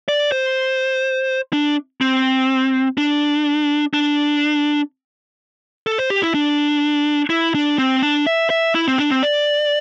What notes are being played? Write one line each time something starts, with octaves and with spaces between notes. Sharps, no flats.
D5
C5
D4
C4
D4
D4
A4
C5
G4
E4
D4
E4
D4
C4
D4
E5
E5
E4
C4
D4
C4
D5